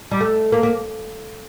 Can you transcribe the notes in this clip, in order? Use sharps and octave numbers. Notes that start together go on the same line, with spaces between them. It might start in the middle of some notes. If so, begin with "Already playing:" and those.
G3
A3
A#3
A#3